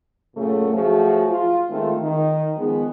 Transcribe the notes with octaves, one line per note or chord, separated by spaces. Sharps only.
F#2 A#2 C#3 A3
F3 F#3 A3 F#4 G#4
F4
D#3 G#3 A3 C4 F4
D#3
D#3 F3 G#3 B3 G#4